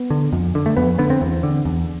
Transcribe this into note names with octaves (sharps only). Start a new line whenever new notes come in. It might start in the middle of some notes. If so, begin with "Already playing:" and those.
Already playing: B3
D3
F2
D3
A3
F2 B3
D3 B3
C4
E2
D3
E2